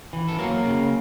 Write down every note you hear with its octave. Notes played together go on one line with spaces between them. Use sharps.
E3
A4
F#3 A#3 A#4
C#3